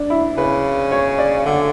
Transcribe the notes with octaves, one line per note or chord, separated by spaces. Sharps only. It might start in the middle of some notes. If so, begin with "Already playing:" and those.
Already playing: D4
E4
C#3 B4
C#5
D5
D3 F#5